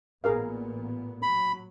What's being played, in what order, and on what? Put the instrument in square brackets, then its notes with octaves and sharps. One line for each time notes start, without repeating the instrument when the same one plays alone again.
[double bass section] A1 A#2 B3 [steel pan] G#4 A#4 F5
[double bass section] F#3 [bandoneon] B5